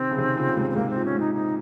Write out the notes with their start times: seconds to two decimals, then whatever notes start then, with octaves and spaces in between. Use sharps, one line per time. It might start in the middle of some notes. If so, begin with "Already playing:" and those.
Already playing: C3 D#3 C4
0.11 C#3
0.18 C3 D#3
0.37 A#2 C#3
0.49 C#3
0.57 G#2 C3
0.70 C4
0.76 G#2 C3 A#3
0.90 C4
0.96 A#2
1.05 C#4
1.15 G#2 D#4
1.34 D#4